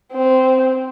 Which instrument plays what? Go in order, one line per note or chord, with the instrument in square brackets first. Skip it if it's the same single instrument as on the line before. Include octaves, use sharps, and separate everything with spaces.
[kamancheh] C4